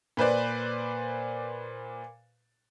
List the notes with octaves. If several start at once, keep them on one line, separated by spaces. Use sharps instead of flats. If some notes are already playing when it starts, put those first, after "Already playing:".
A#2 B4 C5 D5